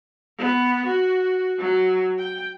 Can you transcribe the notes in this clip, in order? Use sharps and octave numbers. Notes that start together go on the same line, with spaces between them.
B3
F#4
F#3
G5